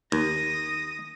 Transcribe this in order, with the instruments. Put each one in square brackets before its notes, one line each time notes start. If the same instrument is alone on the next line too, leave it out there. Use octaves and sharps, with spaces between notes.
[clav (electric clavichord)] D#2 [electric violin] D#6 A#6